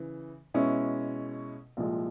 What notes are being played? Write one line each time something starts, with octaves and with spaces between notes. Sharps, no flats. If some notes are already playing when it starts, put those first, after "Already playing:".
Already playing: C#3 E3
B2 G#3 C#4 E4
C2 A#2 F3 G#3